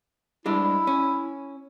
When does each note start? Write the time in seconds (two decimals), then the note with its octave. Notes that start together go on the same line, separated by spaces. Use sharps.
0.46 G3 G#3 D4 E4
0.87 C#4